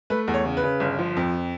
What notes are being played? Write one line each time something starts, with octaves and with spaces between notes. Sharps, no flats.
A3 B4
E2
C#5
C#3
B4
C#3
G1
F3
F2